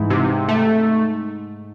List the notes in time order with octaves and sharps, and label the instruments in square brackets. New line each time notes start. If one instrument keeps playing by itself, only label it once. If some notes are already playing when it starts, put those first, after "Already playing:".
Already playing: [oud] G#2 [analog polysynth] E3
[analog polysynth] C3
A3